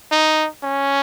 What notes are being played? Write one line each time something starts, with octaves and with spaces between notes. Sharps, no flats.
D#4
C#4